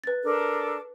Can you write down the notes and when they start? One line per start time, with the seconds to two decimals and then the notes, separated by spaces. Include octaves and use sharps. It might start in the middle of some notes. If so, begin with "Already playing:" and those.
0.04 B4 A6
0.23 D4 A4 A#4